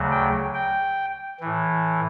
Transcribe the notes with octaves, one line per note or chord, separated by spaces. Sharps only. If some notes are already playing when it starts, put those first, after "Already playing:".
Already playing: D2 C#3 F#3
G5
G5
A2 E3